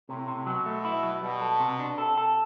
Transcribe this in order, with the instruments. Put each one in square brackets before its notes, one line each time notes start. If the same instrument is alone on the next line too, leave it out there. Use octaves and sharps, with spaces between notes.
[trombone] A2 [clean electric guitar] C3
[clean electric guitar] C3
[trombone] B2 [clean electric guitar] F#3
[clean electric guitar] A3
E4
F#3
[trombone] B2 [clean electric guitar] G3
[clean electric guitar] A4
C3
D4
[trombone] C3 [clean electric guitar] A4
[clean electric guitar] A4